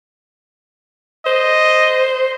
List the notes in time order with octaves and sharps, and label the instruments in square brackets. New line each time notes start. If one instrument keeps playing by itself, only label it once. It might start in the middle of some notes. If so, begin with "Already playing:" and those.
[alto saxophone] C5 [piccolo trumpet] D#5